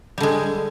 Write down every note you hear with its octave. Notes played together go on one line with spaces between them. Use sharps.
D3 G3 G#3